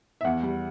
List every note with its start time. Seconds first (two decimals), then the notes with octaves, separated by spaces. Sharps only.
0.21 E5
0.25 E2 F#5
0.43 G3